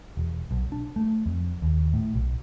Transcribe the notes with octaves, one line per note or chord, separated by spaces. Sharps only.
E1
B1
D4
A3
F2
D#2
A2
B1